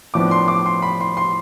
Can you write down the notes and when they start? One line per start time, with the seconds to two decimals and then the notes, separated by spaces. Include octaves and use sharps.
0.14 A2 F3 B3 D4 D6
0.31 C6
0.48 D6
0.66 C6
0.82 B5
1.00 C6
1.17 C6